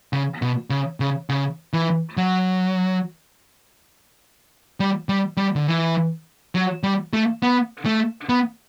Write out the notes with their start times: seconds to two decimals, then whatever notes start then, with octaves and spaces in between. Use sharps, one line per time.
0.13 C#3
0.42 B2
0.70 C#3
1.00 C#3
1.29 C#3
1.73 E3
2.17 F#3
4.80 G3
5.09 G3
5.37 G3
5.56 D3
5.67 E3
6.55 F#3
6.83 G3
7.13 A3
7.42 B3
7.86 A3
8.29 B3